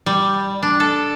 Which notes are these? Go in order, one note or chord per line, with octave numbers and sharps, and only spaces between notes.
G3
D4
A4